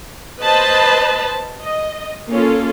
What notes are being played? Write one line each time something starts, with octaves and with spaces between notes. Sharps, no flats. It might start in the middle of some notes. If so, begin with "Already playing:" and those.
B4 C5 D#5 A5 B5
D#5
A#3 C#4 F4 A4